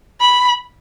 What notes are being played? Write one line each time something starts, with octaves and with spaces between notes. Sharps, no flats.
B5